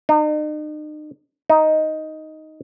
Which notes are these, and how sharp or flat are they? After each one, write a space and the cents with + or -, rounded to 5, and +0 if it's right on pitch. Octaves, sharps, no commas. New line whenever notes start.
D#4 -40
D#4 +5